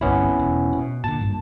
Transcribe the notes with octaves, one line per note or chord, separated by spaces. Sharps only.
G1 C2 C3 B3 C#4 E4
E1
B2
A#2 D3 A5
G#1 G2 A#2